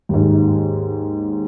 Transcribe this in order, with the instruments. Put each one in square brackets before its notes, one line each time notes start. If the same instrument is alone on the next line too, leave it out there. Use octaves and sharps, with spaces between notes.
[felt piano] D#2 G#2